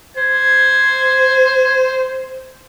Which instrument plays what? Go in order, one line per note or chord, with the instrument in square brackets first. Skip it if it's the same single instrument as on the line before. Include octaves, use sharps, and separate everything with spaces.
[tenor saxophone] C5 [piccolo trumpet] G#6